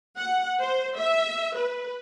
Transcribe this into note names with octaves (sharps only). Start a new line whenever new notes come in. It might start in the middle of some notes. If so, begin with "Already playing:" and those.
F#5
C5
E5
B4